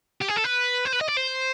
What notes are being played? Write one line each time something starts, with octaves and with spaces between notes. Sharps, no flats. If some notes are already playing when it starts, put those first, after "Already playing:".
G4
G#4
A4
B4
C5
B4
D#5
D5
C5